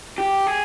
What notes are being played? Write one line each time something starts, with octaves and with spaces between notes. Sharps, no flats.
G4
G#4